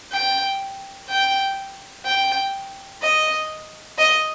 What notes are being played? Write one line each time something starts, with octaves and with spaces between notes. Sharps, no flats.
G5
G5
G5
D#5
D#5